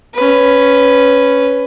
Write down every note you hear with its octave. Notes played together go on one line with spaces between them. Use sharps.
C#4 B4